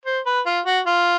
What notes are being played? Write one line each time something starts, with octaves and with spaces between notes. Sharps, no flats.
C5
B4
F4
F#4
F4